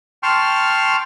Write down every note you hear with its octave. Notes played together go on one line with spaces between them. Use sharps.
G5 A5 C6 C#6 F6